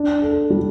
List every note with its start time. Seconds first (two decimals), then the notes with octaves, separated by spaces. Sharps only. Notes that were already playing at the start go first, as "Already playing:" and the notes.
Already playing: D4
0.22 A4
0.50 G3